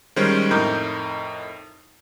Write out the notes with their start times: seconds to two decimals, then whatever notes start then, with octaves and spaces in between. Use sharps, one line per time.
0.16 D#3 G3 G#3 C#4 C5
0.51 F2 A2 D#4 A#4 D6 G6